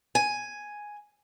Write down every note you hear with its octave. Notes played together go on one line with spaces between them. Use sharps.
G#5